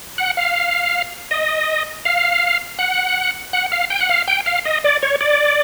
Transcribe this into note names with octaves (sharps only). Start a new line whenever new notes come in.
F#5
F5
D#5
F5
F#5
F#5
F5
G5
F#5
F5
G5
F5
D#5
D5
C#5
D5